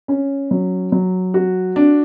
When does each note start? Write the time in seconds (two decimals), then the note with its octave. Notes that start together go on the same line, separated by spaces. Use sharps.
0.08 C#4
0.51 F#3
0.92 F#3
1.34 F#4
1.76 D4